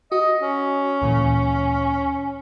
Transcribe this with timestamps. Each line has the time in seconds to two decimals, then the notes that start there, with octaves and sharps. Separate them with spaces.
0.12 F#4 D#5
0.42 C#4
1.02 D2 A#2 E3